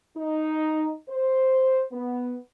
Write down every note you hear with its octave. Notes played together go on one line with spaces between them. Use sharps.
D#4
C5
B3